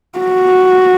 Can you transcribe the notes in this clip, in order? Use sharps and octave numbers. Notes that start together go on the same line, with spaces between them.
F#4